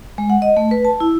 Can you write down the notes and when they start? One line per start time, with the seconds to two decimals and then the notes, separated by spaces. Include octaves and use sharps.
0.18 G#3
0.30 F#5
0.42 D#5
0.57 A3
0.71 B4
0.85 A5
1.00 E4